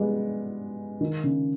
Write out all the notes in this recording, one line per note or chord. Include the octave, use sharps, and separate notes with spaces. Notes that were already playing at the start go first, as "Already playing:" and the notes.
Already playing: G3 G#3 B3
D#3
C#3